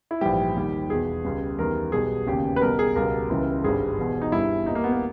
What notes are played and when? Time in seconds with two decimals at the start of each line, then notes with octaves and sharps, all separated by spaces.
0.11 E4
0.21 A#1 G#2 E3 G3 G4
0.56 D#2 D#3 G3
0.89 E1 E2 B2 G#4
1.25 C#2 C#3 G3
1.58 E2 D#3 G3 A#4
1.92 B1 B2 G3 G#4
2.26 E1 D#2 C#3 G4
2.56 B4
2.61 B1 B2 G3 A#4
2.79 G#4
2.96 C#2 B2 G3 A#4
3.29 C#2 C#3 E3 G3
3.64 G#1 G2 G3 G#4
3.98 E1 E2 B2
4.22 D#4
4.32 G1 G2 G3 E4
4.66 D#2 D#3 G3 D#4
4.75 A#3
4.84 B3
4.92 A#3